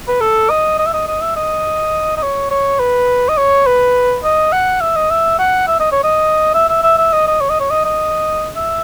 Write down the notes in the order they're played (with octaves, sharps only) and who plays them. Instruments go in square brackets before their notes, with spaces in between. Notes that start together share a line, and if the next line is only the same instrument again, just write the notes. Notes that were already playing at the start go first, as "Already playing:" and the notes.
[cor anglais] B4
A4
D#5
D#5
E5
D#5
D#5
E5
D#5
D#5
C#5
C#5
B4
D#5
C#5
B4
D#5
F#5
E5
D#5
E5
F#5
E5
D#5
C#5
D#5
E5
E5
E5
E5
D#5
D#5
C#5
D#5
C#5
D#5
D#5
E5